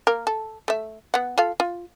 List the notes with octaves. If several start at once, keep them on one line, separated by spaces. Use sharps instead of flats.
A#3 A#4
A4
A3 E5
B3 F#5
F4 A4 F5
F4